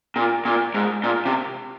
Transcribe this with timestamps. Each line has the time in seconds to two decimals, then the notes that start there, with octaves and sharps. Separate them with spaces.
0.16 A#2
0.45 A#2
0.74 G#2
1.04 A#2
1.25 C3